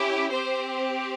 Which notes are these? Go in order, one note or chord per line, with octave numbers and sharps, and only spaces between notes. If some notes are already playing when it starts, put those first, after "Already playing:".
Already playing: C#4 E4 G4
C4 G4 C5